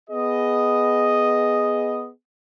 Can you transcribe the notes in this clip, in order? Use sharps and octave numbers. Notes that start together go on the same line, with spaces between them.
B3 G#4 D#5